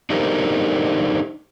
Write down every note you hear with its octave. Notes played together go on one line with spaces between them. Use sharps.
D4 D#4 G4 A4 A#4 C5